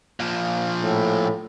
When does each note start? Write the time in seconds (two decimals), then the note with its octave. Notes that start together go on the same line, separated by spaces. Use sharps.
0.20 A#2 F3
0.82 A2